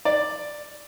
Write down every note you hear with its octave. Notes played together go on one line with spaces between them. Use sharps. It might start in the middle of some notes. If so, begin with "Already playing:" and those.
D5